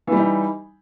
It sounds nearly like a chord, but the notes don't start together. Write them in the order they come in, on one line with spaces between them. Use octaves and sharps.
E3 G3 D#4